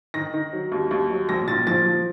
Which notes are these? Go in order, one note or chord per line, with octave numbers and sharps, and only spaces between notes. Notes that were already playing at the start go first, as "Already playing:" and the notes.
D#3 A#6
D#3
F#3
D#2
D#2
F#3
A#1 A#6
A#2 A6
F3 A6
F3